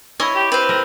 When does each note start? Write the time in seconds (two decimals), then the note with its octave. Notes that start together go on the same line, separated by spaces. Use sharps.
0.20 E4 C#5 D#5 G#5
0.36 G4
0.52 C4 B4 C5
0.69 A#4